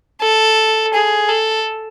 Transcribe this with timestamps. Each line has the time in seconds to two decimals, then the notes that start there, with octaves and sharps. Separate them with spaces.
0.22 A4
0.94 G#4
1.29 A4